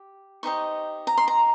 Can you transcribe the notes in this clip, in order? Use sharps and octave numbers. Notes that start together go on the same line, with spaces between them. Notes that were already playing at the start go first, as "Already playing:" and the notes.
Already playing: G4
D#4 G4 C5 D#5 C#6
A#5
C6
A#5